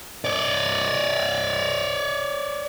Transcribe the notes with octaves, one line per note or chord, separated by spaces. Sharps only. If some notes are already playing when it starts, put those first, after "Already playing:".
C#5 D5